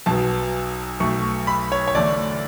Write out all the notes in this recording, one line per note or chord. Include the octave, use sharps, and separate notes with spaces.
B1 B2 F#3 B3 A5
B1 B2 A3 C#6
B5
C#5
C#5
E2 D3 A3 D5